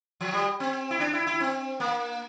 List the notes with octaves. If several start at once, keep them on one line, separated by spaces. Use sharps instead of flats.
F3
G3
C4
E4
D4
E4
E4
C4
A#3